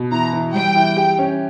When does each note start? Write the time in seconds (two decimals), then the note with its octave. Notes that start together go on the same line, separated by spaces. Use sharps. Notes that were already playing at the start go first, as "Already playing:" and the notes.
Already playing: B2
0.11 E3 A#5
0.33 E3
0.54 G3 G5
0.76 E3
0.97 G4
1.19 C#4